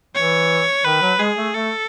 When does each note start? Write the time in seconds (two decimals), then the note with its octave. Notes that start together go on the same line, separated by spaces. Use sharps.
0.15 E3 C#5
0.85 D#3 B4
1.01 F#3
1.19 G#3 G#4
1.37 A3
1.54 A3 A4